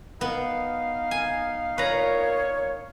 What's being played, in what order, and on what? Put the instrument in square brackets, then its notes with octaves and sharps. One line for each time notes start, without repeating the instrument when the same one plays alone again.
[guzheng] B3 [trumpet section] D#4 F5
[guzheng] G#5
[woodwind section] A#2 C#5 [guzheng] B4 A#5